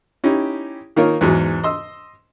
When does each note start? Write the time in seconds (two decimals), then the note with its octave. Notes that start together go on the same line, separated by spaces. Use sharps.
0.24 C#4 D#4 E4 G4
0.96 D#3 A#3 D#4 F4 A#4 C#5
1.21 E2 G#2 F#3
1.64 D#5 C6 E6